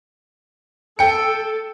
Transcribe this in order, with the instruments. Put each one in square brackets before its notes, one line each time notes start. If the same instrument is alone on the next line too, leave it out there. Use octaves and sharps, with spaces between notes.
[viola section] A4 [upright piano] G5 C#7